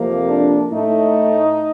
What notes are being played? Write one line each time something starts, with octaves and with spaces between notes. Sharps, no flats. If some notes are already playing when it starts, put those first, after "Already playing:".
Already playing: F2 C3 F3 A#3
D4
A2 A3 D#4